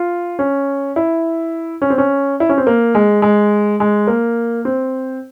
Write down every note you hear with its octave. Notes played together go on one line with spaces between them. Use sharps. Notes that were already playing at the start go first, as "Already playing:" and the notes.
Already playing: F4
C#4
E4
C#4
C4
C#4
E4
C#4
C4
A#3
G#3
G#3
G#3
A#3
C4